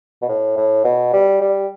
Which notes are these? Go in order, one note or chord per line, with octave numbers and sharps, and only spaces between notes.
B2
A2
A2
B2
G3
G3